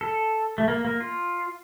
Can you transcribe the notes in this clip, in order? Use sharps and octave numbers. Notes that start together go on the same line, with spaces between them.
A4
A3
A#3
A#3
F4